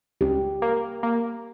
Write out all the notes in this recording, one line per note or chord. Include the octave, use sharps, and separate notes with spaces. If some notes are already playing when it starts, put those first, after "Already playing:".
C#2 G4
A#3
A#3